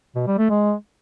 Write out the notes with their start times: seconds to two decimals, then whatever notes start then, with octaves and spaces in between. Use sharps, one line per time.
0.16 B2
0.27 G3
0.38 A3
0.50 G#3